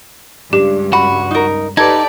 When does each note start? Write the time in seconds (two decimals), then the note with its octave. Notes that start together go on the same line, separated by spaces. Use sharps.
0.53 C#2 G2 D4 G4
0.93 F#4 B5
1.31 D#4 A#4
1.77 D#4 G4 A4 B4 D5 G#6